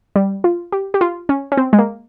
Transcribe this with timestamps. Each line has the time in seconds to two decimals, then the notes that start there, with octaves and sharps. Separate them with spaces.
0.16 G3
0.44 F4
0.72 G4
0.94 G4
1.01 F4
1.29 C#4
1.52 C#4
1.57 C4
1.73 G#3
1.79 A#3